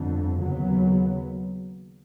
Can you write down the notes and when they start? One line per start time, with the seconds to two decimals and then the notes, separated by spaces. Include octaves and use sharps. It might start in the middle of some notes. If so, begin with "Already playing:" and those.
Already playing: G1 F2 D3
0.41 D#2 C#3 F#3 B3